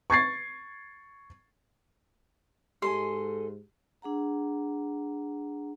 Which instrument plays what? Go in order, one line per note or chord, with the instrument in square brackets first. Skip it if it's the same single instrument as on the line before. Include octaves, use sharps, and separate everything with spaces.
[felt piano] C#6 G#6 A6 C7
[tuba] G#2 [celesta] G4 [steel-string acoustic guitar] A4 D#5 G#5 [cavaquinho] C6
[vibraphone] D4 G#4 F#5 A#5